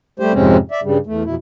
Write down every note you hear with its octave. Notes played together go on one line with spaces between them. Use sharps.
G3 A3 G4 C5
F2 G#2 C3 G#3 C4 C#4
D5 E5
G2 C#3 G3
E2 A3
F2 B2 E4